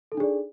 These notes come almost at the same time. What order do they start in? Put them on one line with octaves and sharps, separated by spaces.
A4 D#4 D4 G#4 D5